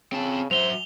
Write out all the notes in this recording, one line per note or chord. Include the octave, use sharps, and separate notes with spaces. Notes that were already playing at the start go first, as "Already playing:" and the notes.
C#3 C4 A5
F#3 C5 E5 F7 G7